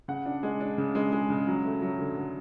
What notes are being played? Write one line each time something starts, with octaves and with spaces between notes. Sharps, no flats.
C#3 F#5
D4
G#3
D4
C#3
G#3
G#3
C#3
F#3
A3
F#3
D3
D3